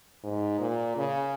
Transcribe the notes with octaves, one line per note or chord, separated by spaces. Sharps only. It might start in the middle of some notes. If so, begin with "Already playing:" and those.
G#2
A#2
C#3